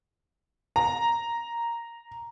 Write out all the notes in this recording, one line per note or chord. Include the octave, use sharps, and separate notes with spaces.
A#5